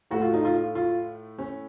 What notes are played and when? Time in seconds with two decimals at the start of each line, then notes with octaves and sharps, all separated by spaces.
0.11 A2 A3 F#4
0.22 F4
0.34 D#4
0.45 F4
0.75 F4
1.38 C#4